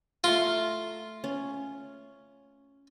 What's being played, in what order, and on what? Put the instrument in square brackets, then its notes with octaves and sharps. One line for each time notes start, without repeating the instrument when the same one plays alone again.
[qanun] A3 A4 A#5 [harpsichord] F4
[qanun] C#4